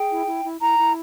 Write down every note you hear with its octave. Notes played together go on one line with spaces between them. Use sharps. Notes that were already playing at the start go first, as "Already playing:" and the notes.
Already playing: G#4 G5
E4
E4
E4
E4 A#5
E4